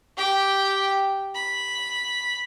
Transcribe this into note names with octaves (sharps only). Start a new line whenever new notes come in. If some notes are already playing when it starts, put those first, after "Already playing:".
G4 G5
B5